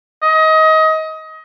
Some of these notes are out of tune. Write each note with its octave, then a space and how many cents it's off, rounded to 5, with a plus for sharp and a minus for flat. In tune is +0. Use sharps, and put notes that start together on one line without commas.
D#5 +25